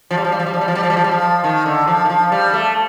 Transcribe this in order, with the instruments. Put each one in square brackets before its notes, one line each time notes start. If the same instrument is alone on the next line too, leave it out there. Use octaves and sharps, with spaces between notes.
[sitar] F3
G3
F3
G3
F3
G3
F3
G3
F3
G3
F3
G3
F3
G3
F3
D#3
D3
F3
D#3
F3
G3
A3